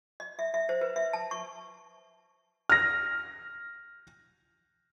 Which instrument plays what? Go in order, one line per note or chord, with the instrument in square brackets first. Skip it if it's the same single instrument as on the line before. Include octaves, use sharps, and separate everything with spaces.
[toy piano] D#5
E5
E5
C5
B4
E5
A5
C#6
[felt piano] F6 A#6